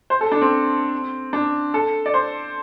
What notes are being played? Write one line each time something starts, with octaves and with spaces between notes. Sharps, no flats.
C5
A4
D4
C4
D4
A4
D5
C5